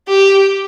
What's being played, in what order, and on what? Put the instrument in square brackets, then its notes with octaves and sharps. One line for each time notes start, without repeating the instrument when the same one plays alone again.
[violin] G4